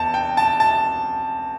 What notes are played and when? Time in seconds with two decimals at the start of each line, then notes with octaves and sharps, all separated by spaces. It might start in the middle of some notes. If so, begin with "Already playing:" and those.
Already playing: E2 A5
0.14 G5
0.37 A5
0.60 A5